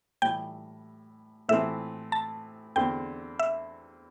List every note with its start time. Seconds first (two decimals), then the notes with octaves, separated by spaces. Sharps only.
0.22 A2 E3 G3 G5
1.49 A2 E3 A3 C4 E5
2.12 A5
2.76 E2 D3 C4 G5
3.39 E5